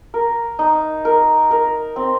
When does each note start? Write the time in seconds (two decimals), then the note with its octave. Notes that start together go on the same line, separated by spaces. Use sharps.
0.14 A#4
0.59 D#4
1.05 A#4
1.51 A#4
1.96 C4